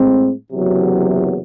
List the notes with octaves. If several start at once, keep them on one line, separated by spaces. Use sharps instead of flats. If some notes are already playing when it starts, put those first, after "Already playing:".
Already playing: A2 G#3 C4
F#1 E2 C3 F#3